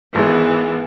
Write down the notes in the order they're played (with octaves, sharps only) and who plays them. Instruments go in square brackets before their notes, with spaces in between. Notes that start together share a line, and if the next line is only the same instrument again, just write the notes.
[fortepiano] G#1 G#3 [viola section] E3 B3